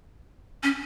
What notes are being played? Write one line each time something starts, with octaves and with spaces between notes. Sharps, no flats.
C#4